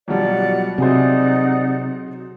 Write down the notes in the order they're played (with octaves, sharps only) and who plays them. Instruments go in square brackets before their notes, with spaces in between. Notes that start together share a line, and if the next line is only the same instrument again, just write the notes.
[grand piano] B1 F3 G3 [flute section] D5 F#5
[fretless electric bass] C3 [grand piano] F#3 G#4 C5 [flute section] D#4 D5 F#5